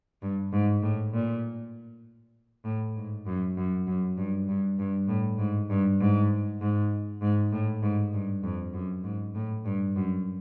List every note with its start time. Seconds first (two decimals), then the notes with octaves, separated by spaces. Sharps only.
0.22 G2
0.52 G#2
0.83 A2
1.13 A#2
2.65 A2
2.96 G#2
3.27 F#2
3.57 F#2
3.87 F#2
4.18 G2
4.49 G2
4.79 G2
5.08 A2
5.39 G#2
5.70 G2
6.00 G#2
6.61 G#2
7.22 G#2
7.52 A2
7.83 G#2
8.13 G2
8.44 F2
8.74 F#2
9.04 G#2
9.35 A2
9.66 G2
9.96 F#2